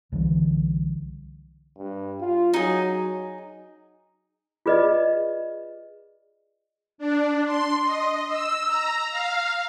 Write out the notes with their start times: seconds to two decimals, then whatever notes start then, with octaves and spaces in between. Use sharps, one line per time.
0.12 C2 D3 E3 G3
1.78 G2
2.21 F4
2.54 F#3 D#4 G#4
4.66 F4 G#4 B4 D5 D#5
6.98 D4
7.45 C6
7.83 D#5
8.28 E6
8.67 A#5
9.10 F5